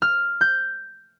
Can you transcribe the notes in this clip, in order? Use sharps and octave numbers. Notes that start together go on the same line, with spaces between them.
F6
G6